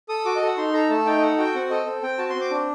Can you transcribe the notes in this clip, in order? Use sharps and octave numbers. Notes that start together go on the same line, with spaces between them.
A4 D#6
F#4 D6
D#5
A4
F#5
D#4 C6
A4 A#5
A3 A5
D#4 G5
D#5
A4 F#5
F#4 G5
C4 F#5
A4 D#5
C4
C4 G5
F#4 A5
C6
C4
D6
D4